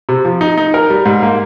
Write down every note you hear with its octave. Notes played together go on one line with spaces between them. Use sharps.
C3
F3
D#4
D#4
A#4
G3
G#2
A#3